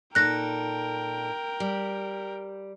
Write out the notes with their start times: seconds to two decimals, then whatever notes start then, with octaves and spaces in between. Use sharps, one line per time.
0.15 A#2 D#4 A4 A#4 G5 F#6 A#6
1.60 G3